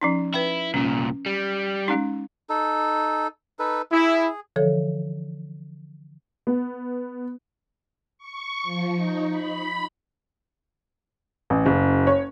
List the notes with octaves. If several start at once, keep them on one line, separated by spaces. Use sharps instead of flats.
F3 C#4 D#4
E4 B4 G5
C2 A#2 C#4
G3
G#3 C#4 D#4
D#4 A4
D#4 A4 B4
E4 G#4
D3 E3 F3 A4 C#5
B3
C#6
F3
D#4
B5
A1
F#1
C#5